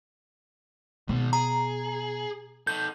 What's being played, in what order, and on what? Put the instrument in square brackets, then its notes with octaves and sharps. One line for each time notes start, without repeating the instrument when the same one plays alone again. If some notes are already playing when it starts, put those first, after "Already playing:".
[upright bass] B2 [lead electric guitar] D#3 G#3
[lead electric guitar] G#4 [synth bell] A#5
[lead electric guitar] D#4 A4 [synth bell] G6